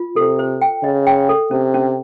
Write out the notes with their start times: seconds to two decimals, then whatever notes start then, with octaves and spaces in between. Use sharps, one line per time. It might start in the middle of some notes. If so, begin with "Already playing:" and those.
Already playing: F4
0.16 C3 A4
0.39 C5
0.62 G5
0.83 C#3 D#5
1.07 G5
1.29 A4
1.51 C3 C#4
1.74 C#4